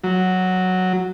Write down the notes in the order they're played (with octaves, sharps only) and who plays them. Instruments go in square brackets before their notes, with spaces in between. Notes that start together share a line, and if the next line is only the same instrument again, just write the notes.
[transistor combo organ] F#3